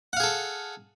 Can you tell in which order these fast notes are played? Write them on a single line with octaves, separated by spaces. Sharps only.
F#5 F5 G#4 A4